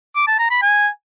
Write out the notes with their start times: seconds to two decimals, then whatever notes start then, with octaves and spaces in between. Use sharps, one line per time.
0.16 D6
0.27 A5
0.39 A#5
0.51 B5
0.62 G#5